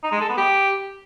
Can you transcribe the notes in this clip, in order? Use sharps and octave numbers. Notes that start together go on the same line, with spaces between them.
D#4
G#3
A4
B3
G4